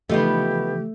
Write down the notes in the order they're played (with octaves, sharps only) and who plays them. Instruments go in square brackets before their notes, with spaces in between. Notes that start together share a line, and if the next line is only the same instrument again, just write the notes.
[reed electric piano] C#3 E3 F3 [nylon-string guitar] A3 [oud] B3 D#4 F4 [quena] G4